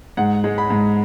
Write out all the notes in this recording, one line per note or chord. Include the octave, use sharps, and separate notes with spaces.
G#2 F#5
G#3
B5
G#2